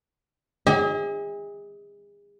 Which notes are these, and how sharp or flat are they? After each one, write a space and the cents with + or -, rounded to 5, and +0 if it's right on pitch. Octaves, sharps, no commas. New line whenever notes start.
G#4 -35 D#5 +40